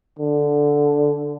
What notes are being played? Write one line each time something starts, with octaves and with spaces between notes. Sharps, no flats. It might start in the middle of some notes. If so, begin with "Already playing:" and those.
D3